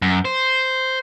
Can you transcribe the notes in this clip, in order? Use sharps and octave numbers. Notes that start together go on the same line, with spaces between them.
F#2
C5